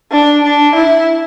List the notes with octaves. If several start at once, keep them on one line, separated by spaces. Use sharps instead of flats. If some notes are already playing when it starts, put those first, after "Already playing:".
D4
D4
E4